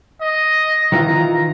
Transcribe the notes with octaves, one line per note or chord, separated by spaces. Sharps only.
D#5
D#3 E3 F4 A#5